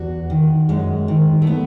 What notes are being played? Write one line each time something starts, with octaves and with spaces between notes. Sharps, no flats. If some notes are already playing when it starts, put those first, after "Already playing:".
Already playing: E2 F#4
D#3
F#2 G#3
D#3
A3
B3